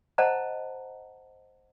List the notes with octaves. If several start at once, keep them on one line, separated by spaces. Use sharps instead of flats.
C5 D#5 F#5 A5 A#5